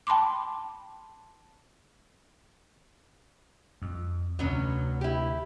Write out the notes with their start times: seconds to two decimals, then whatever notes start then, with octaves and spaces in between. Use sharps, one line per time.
0.07 G5 A5 B5 C6 D6
3.82 F2
4.39 D2 C3 F#3 B3 C#4
5.01 E4 G4